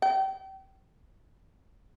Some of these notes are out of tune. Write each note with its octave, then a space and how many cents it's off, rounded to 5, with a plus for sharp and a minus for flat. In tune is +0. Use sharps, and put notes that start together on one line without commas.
G5 -30